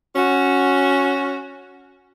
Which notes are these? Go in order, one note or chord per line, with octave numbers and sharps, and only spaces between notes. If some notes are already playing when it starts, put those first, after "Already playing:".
C#4 F#4